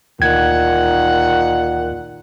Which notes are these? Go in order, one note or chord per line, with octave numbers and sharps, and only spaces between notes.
D2 A#2 D#3 F#5 G#6